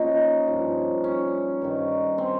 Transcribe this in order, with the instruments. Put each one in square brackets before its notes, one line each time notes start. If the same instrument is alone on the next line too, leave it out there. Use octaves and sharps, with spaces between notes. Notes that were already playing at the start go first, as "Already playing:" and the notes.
Already playing: [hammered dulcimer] A#2 F3 C#4 D#4
G2 F3
C#4
G2 D#3
C4